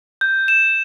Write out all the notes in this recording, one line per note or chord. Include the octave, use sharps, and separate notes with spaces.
G6
E7